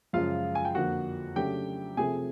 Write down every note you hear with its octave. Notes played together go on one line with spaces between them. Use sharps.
F#2 C#3 F3 G#3 F4 F5
G#5
G5
F2 D3 F3 A#3 F#4 F#5
C#3 F#3 A3 D4 G4 G5
C3 F3 A3 C4 G#4 G#5